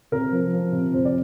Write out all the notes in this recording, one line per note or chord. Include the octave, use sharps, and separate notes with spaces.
C3 A#4
F3
F3
C3
F2 C5
D5